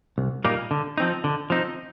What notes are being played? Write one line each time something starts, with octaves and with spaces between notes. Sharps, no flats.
C2
A#2 G3 A#3 D#4
D3
F3 C4 D#4
D3
F3 C4 D#4